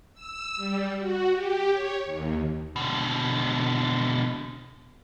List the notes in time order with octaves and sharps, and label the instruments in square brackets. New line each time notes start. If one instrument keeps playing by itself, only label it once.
[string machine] E6
G3
F#4
G4
C#5
D#2
[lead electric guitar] B2 D3